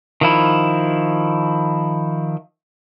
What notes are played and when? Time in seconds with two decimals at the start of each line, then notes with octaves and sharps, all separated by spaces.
0.21 D#3 F3 E4